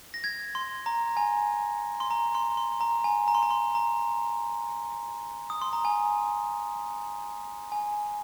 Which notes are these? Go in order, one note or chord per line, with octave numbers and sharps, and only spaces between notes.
A#6
G#6
C6
A#5
G#5
C6
A#5
C6
C6
A#5
G#5
A#5
C6
A#5
C6
A#5
D#6
C6
A#5
G#5
G#5